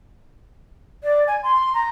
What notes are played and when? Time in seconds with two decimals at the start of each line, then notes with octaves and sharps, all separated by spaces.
1.04 D5
1.27 G#5
1.43 C6
1.74 A#5